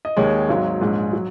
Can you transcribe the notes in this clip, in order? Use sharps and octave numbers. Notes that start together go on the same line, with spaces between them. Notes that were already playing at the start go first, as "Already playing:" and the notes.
D#5
D#2 D#3 G#3 C#5
G#1 G#2 F#3
A#1 G#2 G#3
F#3